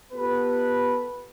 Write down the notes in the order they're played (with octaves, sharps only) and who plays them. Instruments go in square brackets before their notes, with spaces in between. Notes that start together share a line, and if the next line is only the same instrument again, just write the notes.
[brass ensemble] B3 F4 G4 A4 B4